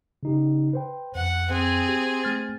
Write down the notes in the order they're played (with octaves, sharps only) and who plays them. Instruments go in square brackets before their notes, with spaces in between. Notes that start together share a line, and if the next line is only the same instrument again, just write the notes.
[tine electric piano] C#3 D#4 G4
B4 C5 G5
[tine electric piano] F2 [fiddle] F#5
[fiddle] C4 G#4
[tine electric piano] G4
A3 F6 A6